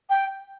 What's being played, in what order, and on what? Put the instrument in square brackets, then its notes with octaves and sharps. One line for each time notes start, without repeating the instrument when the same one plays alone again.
[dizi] G5